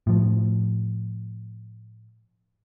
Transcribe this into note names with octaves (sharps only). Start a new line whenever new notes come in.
A2 F3